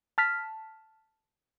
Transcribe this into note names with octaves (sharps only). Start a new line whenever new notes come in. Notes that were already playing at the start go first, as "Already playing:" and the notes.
A5 F6 B6